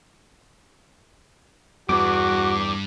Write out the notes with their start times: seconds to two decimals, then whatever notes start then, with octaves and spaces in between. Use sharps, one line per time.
1.89 E2 G2 F#4 D6